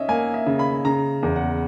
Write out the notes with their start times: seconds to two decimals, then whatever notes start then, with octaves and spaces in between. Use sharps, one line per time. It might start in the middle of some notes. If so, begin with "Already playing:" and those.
Already playing: C#4 D#5 E5
0.08 A#3 G#5
0.34 E5
0.46 C#3
0.59 B5
0.85 C#3 A#5
1.23 E2
1.36 F#5